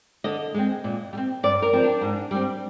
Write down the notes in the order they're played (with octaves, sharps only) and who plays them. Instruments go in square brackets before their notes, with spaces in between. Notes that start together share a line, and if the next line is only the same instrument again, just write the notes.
[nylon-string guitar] D3 D#5
G#3 C4
A#2
G3
C4
G2 D5
A#4
F3 C4
D4
G#2
G3 C4